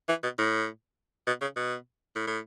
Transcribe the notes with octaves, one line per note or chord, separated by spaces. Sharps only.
E3
B2
A2
B2
C#3
B2
A2
A2